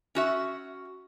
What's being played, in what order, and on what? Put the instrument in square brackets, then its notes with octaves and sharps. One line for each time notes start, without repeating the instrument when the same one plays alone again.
[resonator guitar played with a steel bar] C#4 F#4 E5